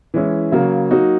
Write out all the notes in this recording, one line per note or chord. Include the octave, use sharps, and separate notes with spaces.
E3 G#3 C#4 E4
C#3 F#3 A#3
F#3 A#3 D#4 F#4